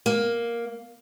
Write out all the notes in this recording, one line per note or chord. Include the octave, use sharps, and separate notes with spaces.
A#3